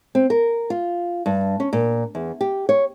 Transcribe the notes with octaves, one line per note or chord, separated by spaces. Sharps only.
C4
A#4
F4
G2
C#4
A#2
E2
G4
C#5